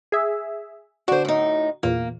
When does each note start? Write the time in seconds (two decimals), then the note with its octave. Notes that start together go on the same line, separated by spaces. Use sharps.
0.12 G#4 E5
1.08 D3 D4 F#4 C5
1.25 A2 D#4
1.83 E2 A#2 A#3